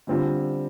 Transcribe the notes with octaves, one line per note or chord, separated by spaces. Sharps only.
D3 G3 C4 F4